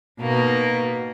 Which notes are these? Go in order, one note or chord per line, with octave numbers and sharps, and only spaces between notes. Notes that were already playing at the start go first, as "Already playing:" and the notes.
B2 A#3 D#4